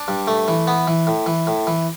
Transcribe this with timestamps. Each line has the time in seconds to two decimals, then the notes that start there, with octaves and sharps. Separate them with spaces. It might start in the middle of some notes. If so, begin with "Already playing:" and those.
Already playing: D4
0.08 G2
0.27 A3
0.48 E3
0.67 B3
0.87 E3
1.07 A2
1.26 E3
1.47 A2
1.67 E3